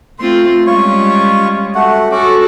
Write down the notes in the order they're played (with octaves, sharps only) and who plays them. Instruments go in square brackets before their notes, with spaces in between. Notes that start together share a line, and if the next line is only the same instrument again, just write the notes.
[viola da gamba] A3 C4 F4 [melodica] C6
[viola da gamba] G3 G#3 C#4 [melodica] F4 C#5 C#6
[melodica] A3 F#4 F#5
[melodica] C#4 D6 [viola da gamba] F#4 A4